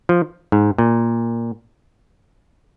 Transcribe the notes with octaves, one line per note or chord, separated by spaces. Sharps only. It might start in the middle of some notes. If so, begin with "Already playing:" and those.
F3
G#2
A#2